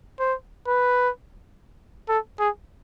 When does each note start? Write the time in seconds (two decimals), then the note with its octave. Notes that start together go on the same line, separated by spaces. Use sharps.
0.20 C5
0.67 B4
2.09 A4
2.40 G#4